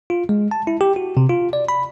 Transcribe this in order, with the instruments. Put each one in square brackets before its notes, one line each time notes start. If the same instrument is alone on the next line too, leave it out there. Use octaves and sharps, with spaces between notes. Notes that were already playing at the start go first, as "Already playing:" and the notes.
[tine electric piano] F4
G#3
A5
E4
G4
F#4
C3
F4
D5
B5